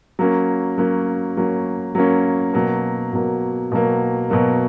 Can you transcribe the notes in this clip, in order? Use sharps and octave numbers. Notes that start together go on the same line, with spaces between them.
F#3 A#3 C#4
F#3 A#3 C#4
F#3 A#3 C#4
F#3 A#3 C#4
B2 F#3 A#3
B2 F#3 A#3
B2 F#3 A#3
B2 F#3 A#3